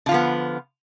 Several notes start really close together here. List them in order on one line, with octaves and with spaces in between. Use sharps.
D3 F4 F3 B3